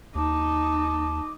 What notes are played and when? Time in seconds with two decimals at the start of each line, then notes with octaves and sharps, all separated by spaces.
0.15 D#2 D#4 D#5 A5 D6